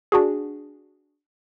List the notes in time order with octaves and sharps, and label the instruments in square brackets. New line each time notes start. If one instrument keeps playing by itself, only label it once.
[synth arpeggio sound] D4 F#4 G#4